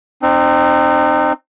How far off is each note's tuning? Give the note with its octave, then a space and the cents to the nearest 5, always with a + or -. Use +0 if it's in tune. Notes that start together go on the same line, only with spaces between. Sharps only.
C4 +10 D#4 -35